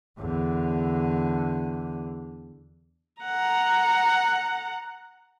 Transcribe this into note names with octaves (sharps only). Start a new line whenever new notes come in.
E2 D3
F#5 A#5